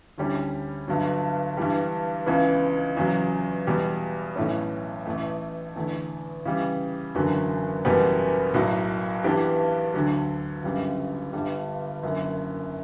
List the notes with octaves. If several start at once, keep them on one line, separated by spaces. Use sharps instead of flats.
D2 D3 G3 C#4 E4
G1 G2 D3 F#3
G2 E3 G3
C#2 C#3 E3 B3
E2 C#3 F#3
E2 B2 G3
B1 A2 E3 A3 C#4
A1 A2 E3 A3
E2 D3 A3 E4
C#3 E3 G3
F#1 E2 D3 F#3
F#1 E2 B2 G3 B3
B1 A2 F#3
G2 E3 B3 D4 G4
D2 D3 F#3
G1 F#2 C#3 G3
G1 G2 D3 G3
F#1 F#2 D3